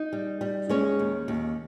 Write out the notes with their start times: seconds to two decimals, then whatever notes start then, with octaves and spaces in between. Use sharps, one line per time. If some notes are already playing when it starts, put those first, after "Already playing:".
Already playing: D#4 D#5
0.13 G3
0.41 G3
0.69 G#3 C#4 C#5
0.99 D#2
1.28 D#2